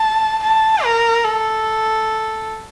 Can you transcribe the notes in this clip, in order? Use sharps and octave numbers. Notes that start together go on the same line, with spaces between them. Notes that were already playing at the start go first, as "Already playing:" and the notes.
Already playing: A5
A5
A#4
A4